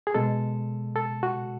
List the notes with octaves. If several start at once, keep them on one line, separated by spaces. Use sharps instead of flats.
G#4
B2 G#3 A4
A4
F#4